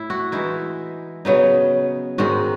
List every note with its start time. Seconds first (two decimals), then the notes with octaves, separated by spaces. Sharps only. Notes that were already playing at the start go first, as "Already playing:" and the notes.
Already playing: A2 E4
0.10 F#4
0.32 E3 G#3 D#4 E4
1.25 C#3 F#3 B3 D#4
2.18 G#2 D#3 G#3 F#4